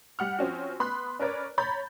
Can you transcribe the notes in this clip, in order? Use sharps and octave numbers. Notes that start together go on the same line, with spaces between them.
G3 F#5 F6
F3 C4 C#4 F#4
B3 B5 C6 F#6
C#4 A#4 B4 C#5 D5
C#5 A#5 B5 G6 A6